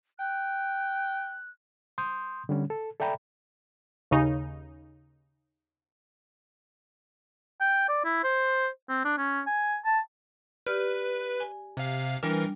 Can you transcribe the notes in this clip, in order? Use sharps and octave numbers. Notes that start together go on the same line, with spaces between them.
G5 F#6
C6 D#6 G6
D3 G3 C#4
A4
A4 D5 E5 G5 A#5 B5
D#2 C#3 D#4
G5
D5
E4
C5
C4
D4
C#4
G#5
A5
G4 B4 D5 F6
G#5
C3 F5
E3 G3 D4 A#4